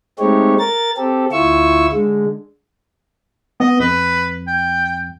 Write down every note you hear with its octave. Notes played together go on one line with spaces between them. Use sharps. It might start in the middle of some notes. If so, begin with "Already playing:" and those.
G#3 A3 C4 D#4 G4 C#5
A#4 A6
C4 G4 A4
D2 E4 F4 C#6 E6
D3 G#3
B3 D#5
F2 B4
G5